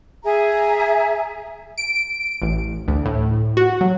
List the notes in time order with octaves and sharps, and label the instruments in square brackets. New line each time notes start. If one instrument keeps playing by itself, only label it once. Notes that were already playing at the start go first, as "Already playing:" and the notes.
[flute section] G#4 E5 G#5 A#5
[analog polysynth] D7
A1
D2
A2
F#4
F#3